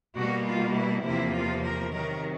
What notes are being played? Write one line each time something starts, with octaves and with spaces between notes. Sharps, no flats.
B2 G3 A#3 F#4
F4
E4
E2 C3 F3 A#3 E4
F4
A#4
C3 D#3 F#3 A#4